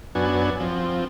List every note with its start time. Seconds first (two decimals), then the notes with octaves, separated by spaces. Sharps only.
0.15 F#2 B3 D4 F#4 G#5
0.60 F3 C4